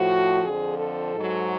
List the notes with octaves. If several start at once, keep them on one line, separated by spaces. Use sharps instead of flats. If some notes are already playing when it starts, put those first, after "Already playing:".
Already playing: A2 F3 F#4
F2 D3 F3 G#4
A4
G#2 F#3